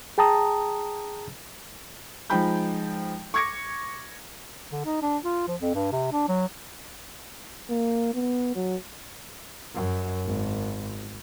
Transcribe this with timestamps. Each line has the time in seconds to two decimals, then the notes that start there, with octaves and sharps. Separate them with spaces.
0.18 G#4 G5 A5 A#5 D#6
2.30 F3 G#3 D#4 G5 B5 G6
3.34 C#6 D6 G#6 A#6 C#7
4.72 D3
4.85 D#4
5.02 D4
5.24 F4
5.48 F3
5.61 F2
5.75 G2
5.92 C3
6.13 D4
6.28 F#3
7.70 A#3
8.14 B3
8.55 F#3
9.74 F#2
10.26 G#1